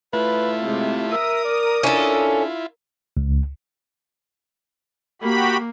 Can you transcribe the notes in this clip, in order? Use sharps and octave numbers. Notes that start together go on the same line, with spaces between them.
A3 E4 F4 B4
C3 G#3
A#4 E5 D#6
D5
C#4 D4 E4 F4 A4
C#2
A#3 F#4 G4 B5